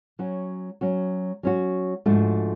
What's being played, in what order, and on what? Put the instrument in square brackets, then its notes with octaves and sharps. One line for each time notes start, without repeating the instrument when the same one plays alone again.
[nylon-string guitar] F#3 C#4 F#4
F#3 C#4 F#4
F#3 C#4 F#4
G#2 F3 A3 D4 F#4